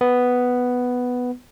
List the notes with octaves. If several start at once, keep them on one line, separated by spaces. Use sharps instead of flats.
B3